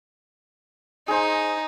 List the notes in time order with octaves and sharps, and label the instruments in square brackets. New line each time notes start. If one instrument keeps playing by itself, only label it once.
[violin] D#4 [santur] G#4 C5